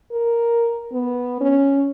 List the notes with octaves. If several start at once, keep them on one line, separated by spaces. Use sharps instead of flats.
A#4
B3
C#4